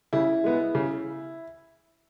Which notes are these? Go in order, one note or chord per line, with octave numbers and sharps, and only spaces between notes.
C#3 E4
G#3 B3
C#3